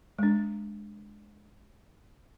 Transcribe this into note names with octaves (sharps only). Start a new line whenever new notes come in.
G#3 D4